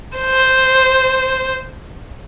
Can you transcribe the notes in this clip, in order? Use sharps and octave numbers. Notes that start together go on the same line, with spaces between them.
C5